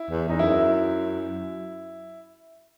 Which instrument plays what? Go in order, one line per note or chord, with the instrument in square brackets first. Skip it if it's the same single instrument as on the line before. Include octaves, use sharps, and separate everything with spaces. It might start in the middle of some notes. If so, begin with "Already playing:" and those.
Already playing: [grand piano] E4
[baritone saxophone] E2
[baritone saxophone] E2 [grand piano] D#4
[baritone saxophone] F#2 [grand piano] E4